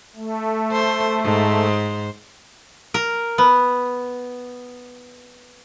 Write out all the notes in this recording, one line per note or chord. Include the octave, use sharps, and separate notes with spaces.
A3
C5
G#2 C5
A#4
B3